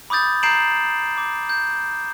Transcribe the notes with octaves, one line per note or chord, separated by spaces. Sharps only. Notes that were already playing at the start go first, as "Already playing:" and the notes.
B5 D6 D#6 G6 A6
A#5 G6 C7 D7 E7 F#7
D6
G6